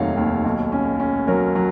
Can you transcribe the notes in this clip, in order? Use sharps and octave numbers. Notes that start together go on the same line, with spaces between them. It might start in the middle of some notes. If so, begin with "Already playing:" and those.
Already playing: F1 D#2 D#3 F#3 C#5 F5 F#5
D#2
B1
C#4
C#4
F#3 A#4 C#5
F#3